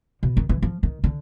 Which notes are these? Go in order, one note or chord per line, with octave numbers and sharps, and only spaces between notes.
B2
D#3
E3
F3
D#3
D3